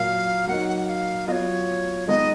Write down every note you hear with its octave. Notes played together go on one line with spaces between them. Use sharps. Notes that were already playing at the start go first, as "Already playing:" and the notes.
Already playing: A#2 F#3 A#3 F5
F#3 A#3 D#4 F#5
F#5
F5
F#3 B3 F4 C#5 D#5
D#3 G#3 B3 D#4 D#5